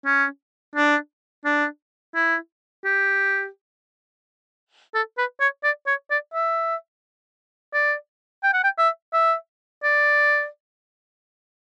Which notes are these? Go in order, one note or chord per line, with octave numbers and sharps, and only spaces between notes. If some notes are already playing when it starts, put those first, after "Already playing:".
C#4
D4
D4
E4
G4
A4
B4
C#5
D5
C#5
D5
E5
D5
G5
F#5
G5
E5
E5
D5